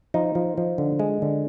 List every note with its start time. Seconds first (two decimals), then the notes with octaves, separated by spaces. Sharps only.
0.14 F3 D#4
0.35 F3
0.58 F3
0.78 D3
0.99 G#3
1.22 D3